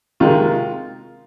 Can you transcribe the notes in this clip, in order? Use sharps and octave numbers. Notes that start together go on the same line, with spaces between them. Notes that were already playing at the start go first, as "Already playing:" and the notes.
C3 D#3 G#3 F4